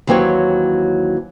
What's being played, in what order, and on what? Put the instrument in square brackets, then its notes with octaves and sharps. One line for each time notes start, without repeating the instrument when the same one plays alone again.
[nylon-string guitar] D#2 E3 F#3 C4 G4 C#5